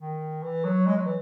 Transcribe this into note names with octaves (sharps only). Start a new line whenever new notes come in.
D#3
E3
F#3
G#3
F#3
E3